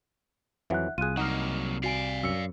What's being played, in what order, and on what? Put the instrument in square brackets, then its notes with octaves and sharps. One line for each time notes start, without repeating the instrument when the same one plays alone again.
[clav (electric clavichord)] F2 E3 F#3 [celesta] E5 F#5 F#6
[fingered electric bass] C2 [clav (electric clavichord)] F4 G#4 [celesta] F#6 D#7
[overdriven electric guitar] F#3 A#3 [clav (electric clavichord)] D#4 D#5 [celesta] F#5 F6
[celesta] F#4 G#5 D7 [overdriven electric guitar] D5 F5
[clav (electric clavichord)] F#2 [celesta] E6 C#7